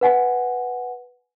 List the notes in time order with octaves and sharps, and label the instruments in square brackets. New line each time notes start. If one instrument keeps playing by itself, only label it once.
[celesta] B4 F#5 G#5